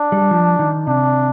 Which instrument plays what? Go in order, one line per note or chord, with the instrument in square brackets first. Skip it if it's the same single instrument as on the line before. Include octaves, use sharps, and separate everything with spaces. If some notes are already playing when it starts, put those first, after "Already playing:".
Already playing: [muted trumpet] D4
[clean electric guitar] G3
F3
D#3
[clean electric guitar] C3 [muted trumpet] D4